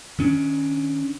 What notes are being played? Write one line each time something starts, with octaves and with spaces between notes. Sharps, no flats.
D#3 C#4 D4